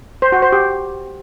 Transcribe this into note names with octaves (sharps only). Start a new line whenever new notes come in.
C5
F#4
C5
G4